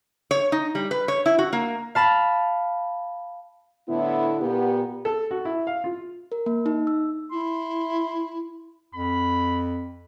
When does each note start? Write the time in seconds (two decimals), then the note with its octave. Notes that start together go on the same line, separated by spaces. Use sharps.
0.31 C#5
0.52 D#4
0.75 G3
0.91 B4
1.08 C#5
1.26 E4
1.39 F#4
1.53 A#3
1.95 F5 A5 B5
3.89 A2 D3 B3 E4
4.41 A#2 B3 G4
5.05 A4
5.31 F#4
5.45 E4
5.67 F5
5.84 F4
6.32 A#4
6.46 A#3
6.66 D#4
6.87 E6
7.31 E4 C6
8.95 F2 B5